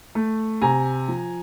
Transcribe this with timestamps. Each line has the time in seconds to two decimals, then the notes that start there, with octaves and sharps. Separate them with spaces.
0.15 A3
0.62 C3 G#5 A#5
1.08 F3